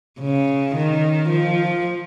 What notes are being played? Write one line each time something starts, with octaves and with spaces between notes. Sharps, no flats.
C#3
D#3
F3